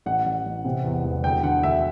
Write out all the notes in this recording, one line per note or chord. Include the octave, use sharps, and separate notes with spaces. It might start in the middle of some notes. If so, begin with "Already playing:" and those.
A1 F#5
A1
A1
C3
E2
E1
D2 G5
D3 F#5
D2 E5